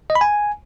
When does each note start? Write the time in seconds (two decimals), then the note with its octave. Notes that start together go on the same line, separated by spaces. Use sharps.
0.10 D#5
0.15 B5
0.21 G#5